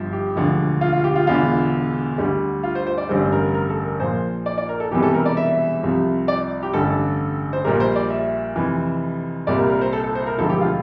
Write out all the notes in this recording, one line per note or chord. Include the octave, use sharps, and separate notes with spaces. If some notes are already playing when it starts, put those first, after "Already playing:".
Already playing: G1 G2 F3
G4
E1 D2 D3 F3
F4
F4
G4
F4
E1 E2 D3 F4
D2 D3 G3
F4
C5
C5
D5
A1 G2 D3 G3 C5
A#4
A#4
A4
A#4
A#1 A#2 F3 C5
D5
D5
A#4
A4
E1 E2 C3 E3 G3 G4
A4
A#4
D5
E5
C2 C3 F3
D5
G4
A1 G2 D3 G3 A4
C5
A#1 A#2 G3 A#4
C5
D5
E5
F1 F2 E3
C2 A#2 G3 D5
A#4
A#4
C5
A4
A4
C5
A#4
E1 D2 D3 F3 A4
G4
F4